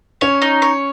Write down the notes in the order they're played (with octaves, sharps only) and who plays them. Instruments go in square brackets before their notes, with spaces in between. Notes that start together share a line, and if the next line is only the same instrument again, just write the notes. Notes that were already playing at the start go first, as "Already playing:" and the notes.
[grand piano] C#4 [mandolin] C#5
[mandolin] D#4
C#5